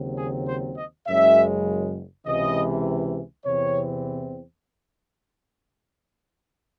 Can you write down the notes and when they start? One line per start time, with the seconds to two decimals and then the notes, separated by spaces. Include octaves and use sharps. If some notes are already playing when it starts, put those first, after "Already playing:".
Already playing: D#2 C#3 F#3 C4
0.18 G#4
0.48 C5
0.77 D#5
1.07 F#1 F#2 C#3 G#3 E5
2.26 C#2 C3 E3 D#5
3.45 E2 C3 E3 C4 C#5